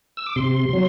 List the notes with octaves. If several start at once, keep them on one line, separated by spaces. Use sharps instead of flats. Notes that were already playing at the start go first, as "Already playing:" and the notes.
E6
D6
C3 C6
F#3